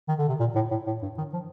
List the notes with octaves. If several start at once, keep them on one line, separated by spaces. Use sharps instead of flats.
D#3
D3
C3
A#2
A2
A2
A2
G2
D#3
F3